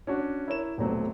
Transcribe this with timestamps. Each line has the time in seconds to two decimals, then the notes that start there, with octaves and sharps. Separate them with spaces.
0.07 C#4 D4 F#4
0.48 E4 A#4 C#5 E7
0.78 D#1 B2 F#3 A3 C4